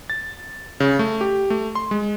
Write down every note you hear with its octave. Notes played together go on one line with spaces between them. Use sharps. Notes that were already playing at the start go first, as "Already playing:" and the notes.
A6
C#3
A3
G4
A3
C6
G#3